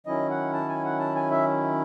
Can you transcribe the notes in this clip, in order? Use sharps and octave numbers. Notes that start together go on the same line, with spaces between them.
D#3 F#3 C#4 E4 D#5
F#5
A5
G#5
F#5
A5
G#5
E5